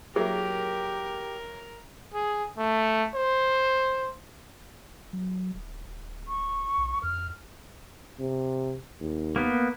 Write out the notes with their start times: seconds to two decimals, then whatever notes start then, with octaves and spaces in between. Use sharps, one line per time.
0.16 F#3 A#3 E4 G4 G#4 A#4
2.14 G#4
2.58 A3
3.14 C5
5.13 F#3
5.55 D1
5.85 D1
6.28 C#6
6.78 B1
7.03 F2 F6
8.20 C3
9.01 D#2
9.36 A#3 B3